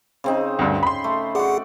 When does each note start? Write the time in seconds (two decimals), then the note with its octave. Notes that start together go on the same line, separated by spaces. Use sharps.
0.24 C#3 C4 D#4
0.59 D2 G2
0.83 B5 C6
1.04 A3
1.35 F#4 G#4 D5 F#5